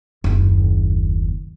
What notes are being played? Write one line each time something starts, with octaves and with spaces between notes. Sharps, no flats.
F#1 D#2